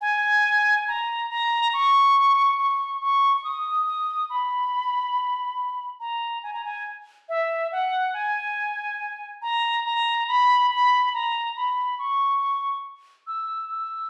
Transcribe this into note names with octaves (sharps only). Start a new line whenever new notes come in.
G#5
A#5
A#5
C#6
C#6
C#6
C#6
D#6
D#6
B5
A#5
G#5
A#5
G#5
E5
F#5
G#5
A#5
A#5
B5
B5
A#5
B5
C#6
E6
E6